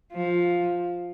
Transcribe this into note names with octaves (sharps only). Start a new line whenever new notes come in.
F3